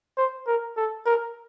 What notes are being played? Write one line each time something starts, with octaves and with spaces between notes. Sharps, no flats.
C5
A#4
A4
A#4